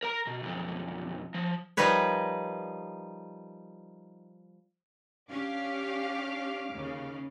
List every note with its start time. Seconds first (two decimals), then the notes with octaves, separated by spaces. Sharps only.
0.03 A#4 A#5
0.27 B2
0.43 B1 F2
1.34 F3
1.77 F3 G3 D#4 A#4 B4 C#5
5.31 C#4 D4 G4 F5 D6 F6
6.72 D#2 C#3